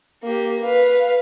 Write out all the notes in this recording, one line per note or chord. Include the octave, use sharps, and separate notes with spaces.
A#3 G4
B4 F5